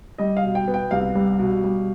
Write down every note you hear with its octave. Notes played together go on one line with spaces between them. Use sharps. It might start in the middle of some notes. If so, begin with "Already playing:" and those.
G3 D#5
F5
B2
G5
B3
G5
C2 F5
G3
B2
G3